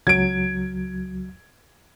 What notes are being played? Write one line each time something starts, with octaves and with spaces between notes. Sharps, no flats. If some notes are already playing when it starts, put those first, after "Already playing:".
C#2 F#3 G#6 D7